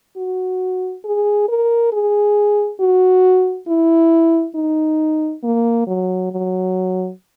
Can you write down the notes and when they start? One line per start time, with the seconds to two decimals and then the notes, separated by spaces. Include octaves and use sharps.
0.17 F#4
1.04 G#4
1.48 A#4
1.92 G#4
2.80 F#4
3.68 E4
4.55 D#4
5.43 A#3
5.87 F#3
6.31 F#3